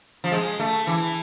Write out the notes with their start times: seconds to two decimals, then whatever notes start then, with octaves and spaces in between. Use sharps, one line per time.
0.24 F3
0.32 G#3
0.60 A3
0.87 E3